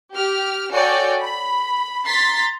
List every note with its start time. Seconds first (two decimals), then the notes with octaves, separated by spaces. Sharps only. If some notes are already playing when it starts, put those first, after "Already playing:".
0.15 G4 F6
0.72 F#4 A4 C#5 D5 G5 G#5
1.21 B5
2.06 A#5 C6 A6 B6